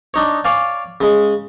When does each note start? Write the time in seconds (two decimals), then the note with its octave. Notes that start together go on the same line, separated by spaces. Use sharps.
0.14 D4 D#4 C#5
0.45 C#5 D5 F5 G#5
1.01 C#3 G#3